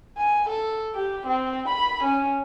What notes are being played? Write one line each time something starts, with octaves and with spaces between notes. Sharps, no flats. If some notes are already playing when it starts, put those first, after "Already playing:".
G#5
A4
G4
C4
B5
C#4